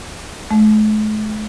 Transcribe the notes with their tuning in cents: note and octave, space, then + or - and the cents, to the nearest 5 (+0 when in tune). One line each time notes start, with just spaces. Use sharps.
A3 -45